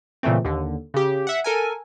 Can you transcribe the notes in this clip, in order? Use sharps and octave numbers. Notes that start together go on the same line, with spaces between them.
A#2 C#3 E3 A3 C4
D#2 D3
C#3 G4
E5 F#5
A4 A#4 G#5